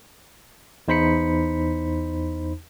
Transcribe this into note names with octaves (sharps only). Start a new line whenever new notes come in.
E2 D#4 C5 B5 B6 C#7